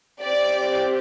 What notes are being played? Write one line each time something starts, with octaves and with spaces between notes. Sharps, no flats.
C4 G4 D5